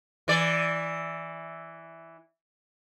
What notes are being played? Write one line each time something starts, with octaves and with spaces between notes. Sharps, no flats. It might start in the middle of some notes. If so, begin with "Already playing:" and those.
E3 D5